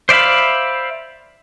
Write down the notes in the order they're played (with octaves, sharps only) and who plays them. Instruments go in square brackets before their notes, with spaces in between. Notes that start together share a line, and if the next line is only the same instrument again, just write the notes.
[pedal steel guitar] C5 D5 E5 F5 B5